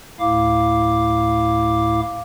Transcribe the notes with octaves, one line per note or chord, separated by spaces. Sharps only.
D2 A2 E4 F5 D6